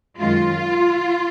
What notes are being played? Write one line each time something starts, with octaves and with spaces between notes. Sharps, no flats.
F#2 D#3 G#3 F4